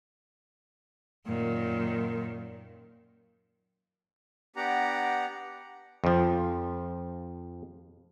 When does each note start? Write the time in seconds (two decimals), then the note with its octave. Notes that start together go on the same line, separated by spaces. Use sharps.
1.26 F#2 A#2 D#3
4.56 B3 D4 G4 F#5 A#5
6.04 F2 F3